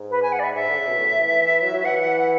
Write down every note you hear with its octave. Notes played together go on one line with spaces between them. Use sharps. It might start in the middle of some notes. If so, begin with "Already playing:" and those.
Already playing: G#2
B4
G#5
F#5
D5
E5
G#2 E5
D3
C#3
B2
A2
E3
E3
F#3
F#3
E3 F#5